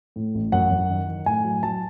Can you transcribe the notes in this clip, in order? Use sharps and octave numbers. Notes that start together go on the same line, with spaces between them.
A2
A1
F#2 F#5
F#2
D#3
D#3
A2 G#5
F#3
F#3 A5